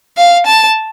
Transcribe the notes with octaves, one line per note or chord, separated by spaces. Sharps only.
F5
A5